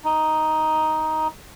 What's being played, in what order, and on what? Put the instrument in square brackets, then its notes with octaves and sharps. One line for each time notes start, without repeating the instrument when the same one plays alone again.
[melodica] D#4